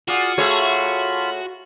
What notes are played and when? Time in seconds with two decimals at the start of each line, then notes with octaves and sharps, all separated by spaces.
0.08 F4 F#4 G#4 D5
0.38 A3 F4 G#4 C#5 B5